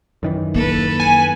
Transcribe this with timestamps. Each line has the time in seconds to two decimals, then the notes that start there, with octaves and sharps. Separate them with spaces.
0.23 F#2 D#3 E3
0.54 A#3 A4 B4
1.00 G#5